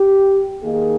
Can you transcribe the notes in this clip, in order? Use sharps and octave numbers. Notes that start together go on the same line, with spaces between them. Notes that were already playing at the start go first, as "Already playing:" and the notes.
Already playing: G4
D#3 A#3 D#4 G#4